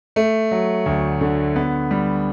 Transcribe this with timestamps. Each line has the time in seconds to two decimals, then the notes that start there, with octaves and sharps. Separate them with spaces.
0.16 A3
0.51 F#3
0.86 D2
1.21 D3
1.56 B3
1.91 G3